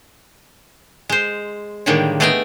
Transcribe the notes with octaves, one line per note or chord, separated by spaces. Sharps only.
G#3 C5
A2 D3 D#3 G3 G#3 A#3
A3 B3 G#4 D#5 G5 G#5